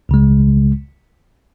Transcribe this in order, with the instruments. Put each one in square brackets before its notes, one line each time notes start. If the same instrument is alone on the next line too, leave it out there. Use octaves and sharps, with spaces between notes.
[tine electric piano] C#2 C#3 G#3